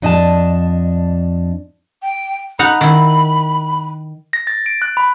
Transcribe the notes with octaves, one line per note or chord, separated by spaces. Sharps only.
F2 D4 D#5 G#5 A5
G5
D#4 F#5 A#5 B5
D#3 E4
A#6
A6
D7
F#6
B5